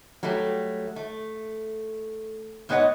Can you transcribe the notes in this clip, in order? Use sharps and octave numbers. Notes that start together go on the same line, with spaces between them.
F#3 G3 A3 G4
A3
G#2 B3 B4 C#5 D#5 F#5